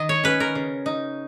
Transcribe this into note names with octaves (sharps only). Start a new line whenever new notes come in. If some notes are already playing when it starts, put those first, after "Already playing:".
Already playing: D#3 D#5
C#5
C#4 B4
A#4
C#3
D#4